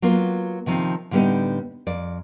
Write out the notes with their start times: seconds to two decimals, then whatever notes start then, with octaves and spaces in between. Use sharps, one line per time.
0.02 F#3 A#3 B3 F4
0.66 C3 D#3 F3 C4
1.11 A2 D3 G3 A#3 B3 D#4
1.87 F2 D5